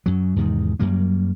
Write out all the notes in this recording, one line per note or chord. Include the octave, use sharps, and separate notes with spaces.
F#2 F#3
E2 G#2 C3 D#3
F#2 F#3 G3 A#3